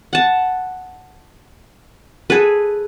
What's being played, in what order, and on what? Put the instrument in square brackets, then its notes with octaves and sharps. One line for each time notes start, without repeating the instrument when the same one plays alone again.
[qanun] F#5 A5
G#4 A4 B4